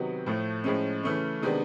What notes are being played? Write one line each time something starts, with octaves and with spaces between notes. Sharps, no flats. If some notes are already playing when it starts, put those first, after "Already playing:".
Already playing: C3 D#3 F#3 B3
A2 F3 A3
A2 F3 G#3 C#4
C#3 E3 A3 C#4
C3 D#3 G#3 B3 D4